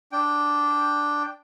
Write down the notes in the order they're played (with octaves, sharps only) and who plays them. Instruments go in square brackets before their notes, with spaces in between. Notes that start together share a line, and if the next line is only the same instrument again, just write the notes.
[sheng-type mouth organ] D4 G5